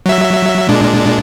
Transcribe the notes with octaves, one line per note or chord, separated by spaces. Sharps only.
F#3 E5
A#2 G#3 D4